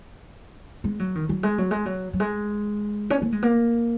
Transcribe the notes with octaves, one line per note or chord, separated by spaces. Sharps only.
G#3
F#3
D#3
F#3
G#3
F#3
G#3
F#3
F#3
G#3
C#4
A#3
G#3
A#3